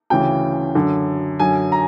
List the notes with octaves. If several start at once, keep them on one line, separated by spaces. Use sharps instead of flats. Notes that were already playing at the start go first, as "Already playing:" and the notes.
D2 C#3 E3 G5
F#2 D3
F#2 D3 G#5
A#5